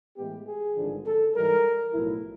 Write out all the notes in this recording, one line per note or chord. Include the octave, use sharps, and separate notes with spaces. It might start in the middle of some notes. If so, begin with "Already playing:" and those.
A2 E3 G#3 B3 G4
G#4
G#1 G2 D3 F3
A4
G#2 E3 G3 A#4
B1 A2 F3 E4